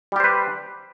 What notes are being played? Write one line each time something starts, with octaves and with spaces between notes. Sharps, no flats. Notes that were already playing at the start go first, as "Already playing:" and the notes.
G3 G4 B4 C5